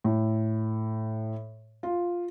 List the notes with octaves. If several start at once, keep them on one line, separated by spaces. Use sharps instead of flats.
A2
F4